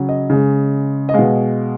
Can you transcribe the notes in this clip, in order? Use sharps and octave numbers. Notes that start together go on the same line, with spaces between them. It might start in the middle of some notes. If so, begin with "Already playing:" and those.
Already playing: C#3 F#3
D#5
C#3 G#3
D#5
B2 G#3 F5